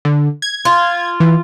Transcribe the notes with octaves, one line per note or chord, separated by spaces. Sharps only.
D3
G#6
F4
E3